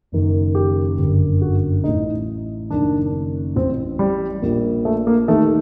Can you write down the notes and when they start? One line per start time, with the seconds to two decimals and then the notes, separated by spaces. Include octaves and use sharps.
0.12 F#1 F#2 D#3
0.55 G4
0.98 G1 F#2 D3
1.41 F#4
1.84 A1 A2 D#4
2.70 F#1 F#2 D#3 D4
3.56 A1 A2 C4
3.99 G3
4.42 A#1 A#2
4.85 A3
5.07 A#3
5.28 D#2 D#3 A3